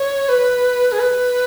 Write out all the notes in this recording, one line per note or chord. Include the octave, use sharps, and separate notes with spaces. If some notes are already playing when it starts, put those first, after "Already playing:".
Already playing: C#5
B4
G#4
B4